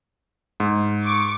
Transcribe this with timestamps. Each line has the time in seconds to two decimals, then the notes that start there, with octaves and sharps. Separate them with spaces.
0.60 G#2
1.04 C#6 D6